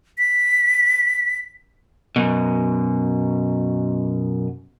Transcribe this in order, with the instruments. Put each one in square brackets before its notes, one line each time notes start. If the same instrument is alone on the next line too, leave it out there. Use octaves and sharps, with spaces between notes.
[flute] B6
[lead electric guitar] F#2 B2